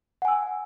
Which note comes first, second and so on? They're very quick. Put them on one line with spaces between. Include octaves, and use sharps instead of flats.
F#5 G#5 E6